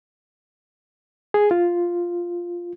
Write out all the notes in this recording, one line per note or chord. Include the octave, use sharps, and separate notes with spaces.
G#4
F4